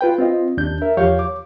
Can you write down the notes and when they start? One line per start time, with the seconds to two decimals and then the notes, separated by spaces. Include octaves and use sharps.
0.01 F4 B4 G5
0.18 C4 F4 D#5
0.57 D#2 D4 G6
0.82 A#4 E5
0.97 E2 F3 G4 C#5 F5 G6
1.19 D6